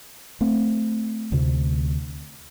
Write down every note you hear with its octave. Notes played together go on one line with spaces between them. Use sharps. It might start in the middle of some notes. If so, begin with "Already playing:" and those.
A3 C4
D2 C3